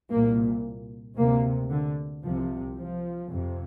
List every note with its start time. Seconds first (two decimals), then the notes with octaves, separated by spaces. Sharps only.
0.11 C2 A#2 A#3
1.17 D2 C3 A#3
1.70 D3
2.23 C2 C3 F3
2.76 F3
3.30 F2 C3